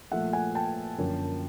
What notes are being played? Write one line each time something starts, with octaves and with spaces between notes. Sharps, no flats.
A#2 F3 A3 E5 F#5
F#5 G#5
G5 A5
F#2 D3 F3 A#3